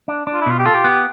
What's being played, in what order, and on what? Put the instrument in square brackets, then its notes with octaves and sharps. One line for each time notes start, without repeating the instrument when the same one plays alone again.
[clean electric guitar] D4
D4
[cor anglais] F4
E4
[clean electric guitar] B2 [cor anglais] F4
[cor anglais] G4
[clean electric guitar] F4 [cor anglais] A4
[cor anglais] G4
[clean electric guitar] B3